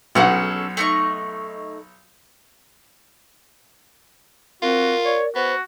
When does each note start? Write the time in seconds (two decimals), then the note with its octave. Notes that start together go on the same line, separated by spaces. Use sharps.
0.15 B1 C#4 G#4 A4 F#5
0.77 A3 D#4 C#6
4.62 C4 F4 F#4 A#4
5.05 C#5 D5
5.35 B3 F#4 C5